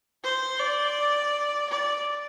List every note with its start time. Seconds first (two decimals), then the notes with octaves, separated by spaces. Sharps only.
0.24 C5
0.60 D5
1.70 D5